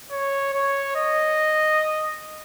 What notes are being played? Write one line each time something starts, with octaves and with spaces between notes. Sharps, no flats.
C#5
C#5
D#5